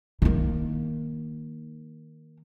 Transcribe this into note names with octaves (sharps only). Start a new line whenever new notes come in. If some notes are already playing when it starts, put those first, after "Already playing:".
D#3 A#3